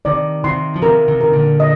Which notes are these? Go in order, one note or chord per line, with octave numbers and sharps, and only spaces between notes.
C3 D#3 D5
C3 D#3 C6
F3
C3 D#3 A#4
C3 D#3
C3 A#4
A#2 D3
D#5